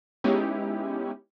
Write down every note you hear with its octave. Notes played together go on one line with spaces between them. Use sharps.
G#3 B3 C#4 D#4 E4 G4